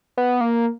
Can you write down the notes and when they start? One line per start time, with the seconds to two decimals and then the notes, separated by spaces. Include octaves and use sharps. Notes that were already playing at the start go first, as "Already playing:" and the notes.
0.17 B3
0.41 A#3